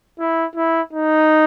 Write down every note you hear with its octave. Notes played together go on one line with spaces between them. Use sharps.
E4
E4
D#4